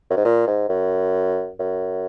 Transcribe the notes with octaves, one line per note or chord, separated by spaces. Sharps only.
F#2
G#2
A#2
G#2
F#2
F#2